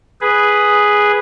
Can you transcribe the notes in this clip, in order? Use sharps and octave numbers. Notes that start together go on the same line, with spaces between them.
G#4 B4